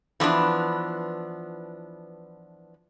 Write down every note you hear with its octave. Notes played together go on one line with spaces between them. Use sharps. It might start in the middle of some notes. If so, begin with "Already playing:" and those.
E3 F3 B3 D4